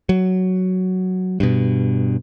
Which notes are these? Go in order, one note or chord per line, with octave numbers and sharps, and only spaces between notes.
F#3
G2 B2